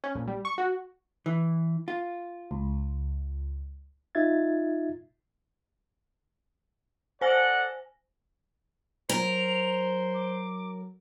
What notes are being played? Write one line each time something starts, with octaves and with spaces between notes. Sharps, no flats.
C#4
A#1
G3
C#6
F#4
E3
F4
C#2
D#4 F4 E5 G#6 A6
A4 C5 D5 F#5 G#5 A#6
F#3 A#4 C5 F7
D6